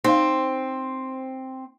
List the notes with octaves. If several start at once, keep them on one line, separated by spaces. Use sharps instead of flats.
C4 D#4 F5